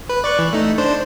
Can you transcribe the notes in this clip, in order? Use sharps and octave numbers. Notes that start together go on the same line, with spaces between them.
B4
D5 C#6 F#6
E3
A3 D#4
D4 C5